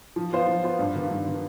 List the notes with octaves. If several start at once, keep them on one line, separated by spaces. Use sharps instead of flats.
F3
B3 F4 C5
F3
B3 F4 C5
G2
D#3 B3 F4
G2
D#3 B3 F4